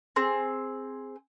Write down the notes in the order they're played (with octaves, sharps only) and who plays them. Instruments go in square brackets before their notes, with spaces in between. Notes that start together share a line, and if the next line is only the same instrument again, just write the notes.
[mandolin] C4 G#4